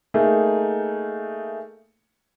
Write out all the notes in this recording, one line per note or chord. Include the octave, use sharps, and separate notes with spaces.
A3 A#3 D#4 G#4